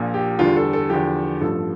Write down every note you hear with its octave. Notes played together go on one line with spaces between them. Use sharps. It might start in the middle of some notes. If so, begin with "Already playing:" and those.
Already playing: A#1 A#2 F3
G4
E2 D3 G3 F4
A4
A4
E2 D3 F3 G4
A1 G2 F3 A4